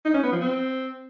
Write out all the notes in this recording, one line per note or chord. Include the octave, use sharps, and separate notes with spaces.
D#4
C#4
B3
F3
C4